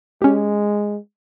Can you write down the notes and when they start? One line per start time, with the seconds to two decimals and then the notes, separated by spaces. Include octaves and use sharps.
0.22 G#3 C#4 G4